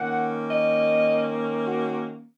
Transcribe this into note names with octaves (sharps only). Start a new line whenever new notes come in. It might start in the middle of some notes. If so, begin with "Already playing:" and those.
Already playing: D#3 A#3 C#4 F#5
D#5
F#4